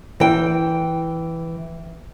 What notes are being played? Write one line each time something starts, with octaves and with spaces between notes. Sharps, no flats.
E3 G5